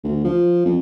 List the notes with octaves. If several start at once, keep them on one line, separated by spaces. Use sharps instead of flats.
D2
F3
F2